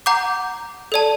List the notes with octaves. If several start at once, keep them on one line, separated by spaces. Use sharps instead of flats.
F#5 A#5 D6 G6
A4 D5 A5